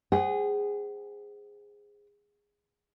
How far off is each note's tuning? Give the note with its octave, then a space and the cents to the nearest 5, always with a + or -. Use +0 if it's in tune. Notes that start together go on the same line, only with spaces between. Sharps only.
G#4 -15 C5 +0 F#5 +35